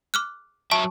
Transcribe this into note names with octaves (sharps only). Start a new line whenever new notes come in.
D6 F6 F#6
F#3 E5 A5 C#6